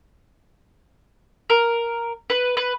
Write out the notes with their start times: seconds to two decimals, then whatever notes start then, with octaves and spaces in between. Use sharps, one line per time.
1.50 A#4
2.30 B4
2.57 B4